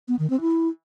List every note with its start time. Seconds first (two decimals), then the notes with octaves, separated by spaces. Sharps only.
0.08 B3
0.19 D#3
0.30 C4
0.41 E4